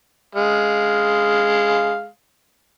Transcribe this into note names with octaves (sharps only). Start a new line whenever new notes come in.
G#3 F5